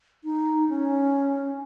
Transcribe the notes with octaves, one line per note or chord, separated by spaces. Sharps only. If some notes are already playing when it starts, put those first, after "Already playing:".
D#4
C#4